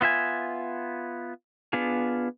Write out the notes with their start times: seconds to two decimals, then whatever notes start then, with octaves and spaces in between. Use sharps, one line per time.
0.01 B3 F4 E5 G#5
1.73 B3 D4 F4 G#4